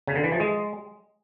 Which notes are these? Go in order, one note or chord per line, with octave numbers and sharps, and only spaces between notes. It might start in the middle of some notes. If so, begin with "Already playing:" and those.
C#3
D3
E3
F3
G#3